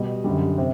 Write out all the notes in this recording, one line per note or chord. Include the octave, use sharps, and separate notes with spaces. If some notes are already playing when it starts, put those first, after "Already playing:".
Already playing: B2 G3 D#5
F#2 D3 G3
C3